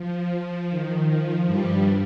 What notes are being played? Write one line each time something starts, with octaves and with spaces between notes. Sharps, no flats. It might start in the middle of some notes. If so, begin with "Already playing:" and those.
Already playing: F3
F3
D#3
F3
G2 G3